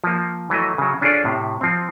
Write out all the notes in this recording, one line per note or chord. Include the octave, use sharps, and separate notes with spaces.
F3 A#3
E3 F#3 A3 D#5
C#3 F#3
C#4 D4 F4 G#4 A4 D5
A2 C3
F3 C4